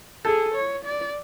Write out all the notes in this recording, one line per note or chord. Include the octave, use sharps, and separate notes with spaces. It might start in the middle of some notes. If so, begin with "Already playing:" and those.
G#4 A4
C#5
D5